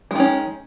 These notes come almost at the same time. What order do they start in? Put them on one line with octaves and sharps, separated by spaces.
G#3 D#3 C#4